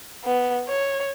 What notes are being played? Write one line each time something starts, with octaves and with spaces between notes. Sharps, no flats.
B3
C#5